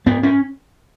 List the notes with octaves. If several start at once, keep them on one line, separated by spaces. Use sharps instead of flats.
G#2 B3
C#4